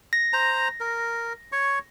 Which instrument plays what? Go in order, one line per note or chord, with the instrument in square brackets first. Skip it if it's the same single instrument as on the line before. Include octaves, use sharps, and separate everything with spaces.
[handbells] A#6
[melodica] C5 A#5
A#4
C#5 C#6